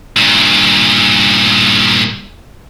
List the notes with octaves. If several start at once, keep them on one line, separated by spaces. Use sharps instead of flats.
G2 A#2